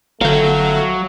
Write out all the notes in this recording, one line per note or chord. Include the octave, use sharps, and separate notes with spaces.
G1 D3 F#3 A3 F5 G5